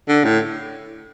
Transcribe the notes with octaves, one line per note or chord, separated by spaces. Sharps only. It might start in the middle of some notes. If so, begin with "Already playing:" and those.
D3
A2